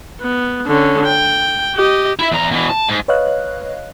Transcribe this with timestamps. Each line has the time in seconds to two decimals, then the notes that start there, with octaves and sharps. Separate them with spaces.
0.21 B3
0.67 D3 C#4
1.05 G5
1.76 G4 D#5
2.19 E4 E5
2.32 E2 A#5
2.51 B2 E3
2.69 A5
2.89 G#2
3.08 B4 C#5 D#5 F5 F#6